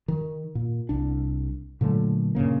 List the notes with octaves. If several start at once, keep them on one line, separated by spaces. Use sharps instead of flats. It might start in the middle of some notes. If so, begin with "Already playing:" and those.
D#3
A#2
C2 D4
A#2 D3 F#3 A3
G2 A#2 C#3 A#3